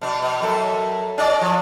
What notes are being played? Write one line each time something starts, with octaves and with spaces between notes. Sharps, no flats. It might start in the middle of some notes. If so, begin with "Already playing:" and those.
B2 D4
B2
F#2 A4
C#4 D5 D#5
F3